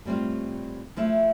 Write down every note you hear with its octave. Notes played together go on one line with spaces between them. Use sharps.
A2 G3 C4 F4
F3 A3 E4